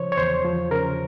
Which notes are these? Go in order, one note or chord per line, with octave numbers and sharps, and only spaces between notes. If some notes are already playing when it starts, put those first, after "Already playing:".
Already playing: C#3 F3 C5 C#5
C#5
E2 C5
F3
C#3 A#4